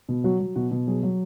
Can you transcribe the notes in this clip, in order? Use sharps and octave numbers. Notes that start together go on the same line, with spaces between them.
B2
F#3 F#4
F#3
B2 F#4
B2
F#3 G#4
F#3